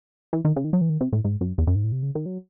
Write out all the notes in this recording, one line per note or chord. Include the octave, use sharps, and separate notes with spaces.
E3
D#3
C#3
D#3
F#3
E3
D#3
C3
A2
G#2
F#2
E2
F#2
G#2
A2
C3
C#3
D#3
F#3